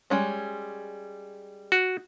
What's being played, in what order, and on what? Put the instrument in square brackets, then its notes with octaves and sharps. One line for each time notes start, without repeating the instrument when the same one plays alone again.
[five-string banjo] G3 G#3 C#4
[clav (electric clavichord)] F#4